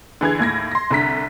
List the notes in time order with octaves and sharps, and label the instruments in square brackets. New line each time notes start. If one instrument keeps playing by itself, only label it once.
[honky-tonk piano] D3 E3 G#4 G#6
D#2 A2 G#6 A#6
C6 A#6
C2 D3 A#5 B6